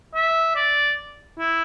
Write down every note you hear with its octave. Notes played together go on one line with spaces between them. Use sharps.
E5
D5
E4